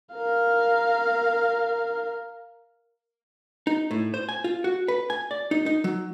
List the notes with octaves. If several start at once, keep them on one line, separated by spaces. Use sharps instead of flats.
A#4 F5
D#4
A2
C5
G#5
F4
F#4
B4
G#5
D5
D#4
D#4
F#3